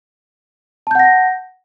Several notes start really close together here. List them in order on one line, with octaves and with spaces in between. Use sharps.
A5 G6 F#5 A#6